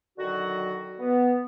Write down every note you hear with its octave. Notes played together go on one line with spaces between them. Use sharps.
D3 D#3 F#3 F#4
B3